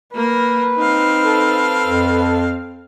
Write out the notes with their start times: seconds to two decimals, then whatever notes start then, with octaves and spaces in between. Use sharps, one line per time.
0.15 A#3 A#4 B4
0.76 C4 D#4 F5
1.23 A4
1.85 F2